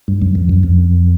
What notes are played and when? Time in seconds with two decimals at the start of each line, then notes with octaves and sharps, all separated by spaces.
0.08 G2
0.22 F#2
0.35 F2
0.49 F#2
0.63 F2